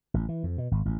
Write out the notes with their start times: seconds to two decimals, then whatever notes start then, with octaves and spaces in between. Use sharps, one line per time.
0.14 A1
0.29 E3
0.43 F2
0.58 B2
0.71 G#1
0.85 A1